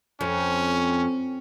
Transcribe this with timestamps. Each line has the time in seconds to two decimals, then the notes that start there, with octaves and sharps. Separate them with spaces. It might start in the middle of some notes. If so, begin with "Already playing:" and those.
0.21 F2 C#4